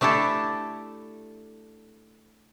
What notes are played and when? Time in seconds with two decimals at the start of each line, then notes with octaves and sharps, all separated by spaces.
0.01 A3 D4 E4 G4 A4